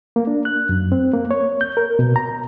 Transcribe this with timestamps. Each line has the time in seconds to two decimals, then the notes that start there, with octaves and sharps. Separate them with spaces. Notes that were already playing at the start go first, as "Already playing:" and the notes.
0.16 A#3
0.27 D4
0.45 F#6
0.69 F#2
0.92 C4
1.14 A#3
1.31 C#5
1.61 G6
1.77 A#4
1.99 B2
2.16 A#5